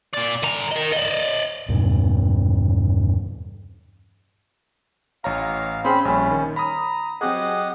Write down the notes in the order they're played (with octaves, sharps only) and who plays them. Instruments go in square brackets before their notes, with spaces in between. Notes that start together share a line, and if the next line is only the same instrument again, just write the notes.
[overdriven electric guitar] A#2 D5
D3 A#5
A#4 D#5
D5 D#5
[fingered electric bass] E2 G2 B2
[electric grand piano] A1 C#5 A#5 [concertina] F5
[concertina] C4 C5 B5 [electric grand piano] C#4 G#4
[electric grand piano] A#1 G3 B5 [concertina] C#4
[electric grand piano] D#3
[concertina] A#5 [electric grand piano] B5 D#6
[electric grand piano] F#3 C4 G#4 [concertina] G4 D#5 F#5